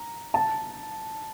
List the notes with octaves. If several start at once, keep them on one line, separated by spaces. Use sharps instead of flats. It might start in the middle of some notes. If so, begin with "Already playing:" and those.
Already playing: A#5
A5